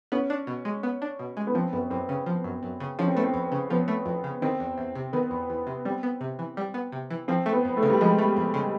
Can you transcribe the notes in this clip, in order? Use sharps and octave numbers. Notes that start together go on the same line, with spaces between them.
B3 C#4
D4
B2
G#3
B3
D4
B2
G#3
B3
F3 C4
F#2 B3
F#2 C4
C#3
F3
F#2
F#2
C#3
F3 C#4
C4
A3 B3
C4
F2
C#3
F3 B3
A3
F2
C#3
D#3 C4
E2
E2
C3
D#3 B3
E2
E2
C3
G3 C4
B3
C3
E3
G3
B3
C3
E3
F3 C4
A3
B3
F2
A3
C#3
G3
F3 G#3
A3
F2
C#3